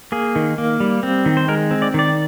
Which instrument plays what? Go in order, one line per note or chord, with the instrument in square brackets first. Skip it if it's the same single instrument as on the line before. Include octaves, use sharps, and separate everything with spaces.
[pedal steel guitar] A#3 G#4
D#3
A#3
G3
C4
D#3
C5
G#3 A#4
C4
D5
D#3 D5